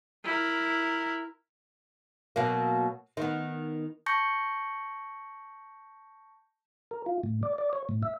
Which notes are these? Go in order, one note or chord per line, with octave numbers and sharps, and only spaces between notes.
E4 A#4
B2 F#3 A#3
D#3 B3
A5 C#6 G6 A#6 C#7
A#4
F4
A2
D5
D5
C#5
A2
E5